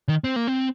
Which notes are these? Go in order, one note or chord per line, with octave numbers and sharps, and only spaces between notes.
D#3
C4
A#3
C4